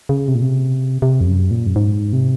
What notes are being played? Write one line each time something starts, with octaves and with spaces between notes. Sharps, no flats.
C#3
C3
A#2
C3
C3
F2
F#2
A#2
F#2
G#2
C3